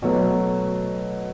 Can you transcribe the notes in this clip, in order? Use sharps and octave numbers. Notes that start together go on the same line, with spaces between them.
B2 F#3 A3